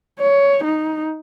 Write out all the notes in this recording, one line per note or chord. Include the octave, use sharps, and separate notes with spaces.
C#5
D#4